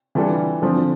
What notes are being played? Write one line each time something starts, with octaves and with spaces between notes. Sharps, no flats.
E3 G3 D4 F4 A4
D3 F3 C4